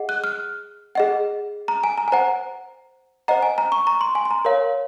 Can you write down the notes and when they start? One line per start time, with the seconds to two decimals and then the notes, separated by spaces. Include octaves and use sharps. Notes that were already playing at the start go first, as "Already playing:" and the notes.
Already playing: G#4 D#5 F#5
0.09 F#6
0.24 F6
0.95 G#4 D#5 F#5
1.68 A#5
1.84 G#5
1.98 A#5
2.08 G#5
2.12 C5 F#5 A#5
3.28 C5 D#5 F#5 A#5
3.43 G#5
3.58 A#5
3.72 C#6
3.87 A#5
4.01 C6
4.15 G#5
4.25 C6
4.31 A#5
4.45 A#4 C#5 F5